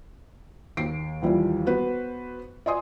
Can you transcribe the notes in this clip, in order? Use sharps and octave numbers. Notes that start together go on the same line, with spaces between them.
D#2 C7 D7
D#2 E3 F3 G3
B3 F#4 B4 C5
D5 D#5 G#5 C6 D#6